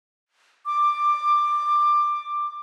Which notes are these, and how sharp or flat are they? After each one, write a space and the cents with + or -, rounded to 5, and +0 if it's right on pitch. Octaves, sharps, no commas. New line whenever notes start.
D6 +15